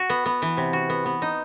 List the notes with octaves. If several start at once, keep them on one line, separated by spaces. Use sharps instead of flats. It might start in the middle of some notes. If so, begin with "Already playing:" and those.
Already playing: F#4
B3
B3
E3
C3
F#4
B3
B3
D#4